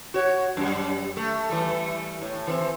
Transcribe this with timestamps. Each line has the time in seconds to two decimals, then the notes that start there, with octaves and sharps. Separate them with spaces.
0.14 F#4 C#5
0.57 F#2 G3
1.17 A3
1.50 E3 G3 A3
2.22 A2
2.47 E3 C4